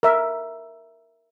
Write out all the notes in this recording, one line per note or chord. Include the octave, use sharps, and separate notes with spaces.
A#4 E5